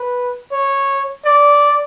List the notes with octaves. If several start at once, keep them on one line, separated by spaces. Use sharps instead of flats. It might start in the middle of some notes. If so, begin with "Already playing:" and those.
Already playing: B4
C#5
D5